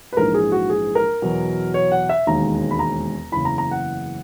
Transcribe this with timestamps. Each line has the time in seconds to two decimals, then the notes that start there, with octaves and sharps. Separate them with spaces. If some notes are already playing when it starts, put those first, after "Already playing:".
0.13 B4
0.17 A#1 G#2 E3 G#3 A#4
0.34 G#4
0.52 F#4
0.70 G#4
0.95 A#4
1.22 E2 B2 F#3
1.74 C#5
1.92 F#5
2.09 E5
2.27 E1 D#2 D#3 G#3 A#5
2.71 B5
2.79 A#5
3.32 F#1 E2 C#3 E3 B5
3.45 A#5
3.58 A#5
3.71 F#5